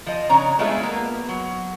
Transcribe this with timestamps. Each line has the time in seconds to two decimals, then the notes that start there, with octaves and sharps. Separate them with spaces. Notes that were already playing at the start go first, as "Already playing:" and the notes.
0.06 F3 D#5
0.29 C#3 D4 C#5 A#5
0.59 G#3 A3 B3 F4 G#4 E5
0.83 A#3 B3
1.28 F#3